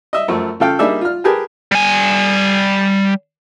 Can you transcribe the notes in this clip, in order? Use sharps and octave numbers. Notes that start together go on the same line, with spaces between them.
D#5 E5
F#2 F3 A3
C#3 F4 A4 F5 G5
G3 A#3 D4 D#4 G#4 E5
F4 F6
G4 G#4 A#4 B4 A5
G3 G#5